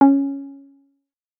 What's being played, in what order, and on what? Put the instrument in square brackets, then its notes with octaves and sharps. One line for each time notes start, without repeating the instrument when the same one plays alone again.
[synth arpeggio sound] C#4